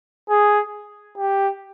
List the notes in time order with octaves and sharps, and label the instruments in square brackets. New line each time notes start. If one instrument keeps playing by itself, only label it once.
[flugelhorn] G#4
G4